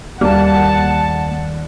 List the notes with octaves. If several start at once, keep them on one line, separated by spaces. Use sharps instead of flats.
D#2 G3 A#3 F#5 A5